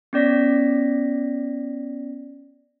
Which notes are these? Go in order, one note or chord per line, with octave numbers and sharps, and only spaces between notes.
B3 C#4 D5 A#6 B6